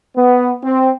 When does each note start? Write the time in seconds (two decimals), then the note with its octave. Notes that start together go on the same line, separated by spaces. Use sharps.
0.17 B3
0.64 C4